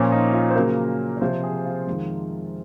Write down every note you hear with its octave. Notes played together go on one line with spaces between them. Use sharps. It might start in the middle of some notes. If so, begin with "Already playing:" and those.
Already playing: A#2 F3 A#3 C#4 F4
D#4
F4
C5
C#3 F#3 A#3 A#4
C#5
C3 F3 C4 C5
G#4
F4
F2 D#3 G#3